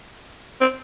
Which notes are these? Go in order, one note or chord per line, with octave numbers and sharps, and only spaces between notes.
C4